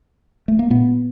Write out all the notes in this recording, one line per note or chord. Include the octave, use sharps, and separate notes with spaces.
A3
A#3
A#2 B3